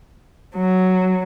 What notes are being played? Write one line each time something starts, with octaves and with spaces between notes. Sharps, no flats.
F#3